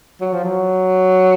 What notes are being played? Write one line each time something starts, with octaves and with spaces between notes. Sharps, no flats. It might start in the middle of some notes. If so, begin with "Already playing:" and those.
F#3
F3
F#3